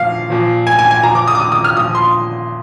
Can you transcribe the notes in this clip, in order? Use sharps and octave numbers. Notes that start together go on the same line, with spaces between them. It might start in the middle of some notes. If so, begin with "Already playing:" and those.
Already playing: A#2 F3 F5
A#2 F3
G#5
G#5
G#5
A#2 F3 A#5
D6
D#6
D6
D#6
D#6
F6
A#2 F3 D#6
C6